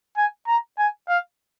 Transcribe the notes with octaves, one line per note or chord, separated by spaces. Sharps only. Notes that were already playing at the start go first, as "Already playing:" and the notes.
G#5
A#5
G#5
F5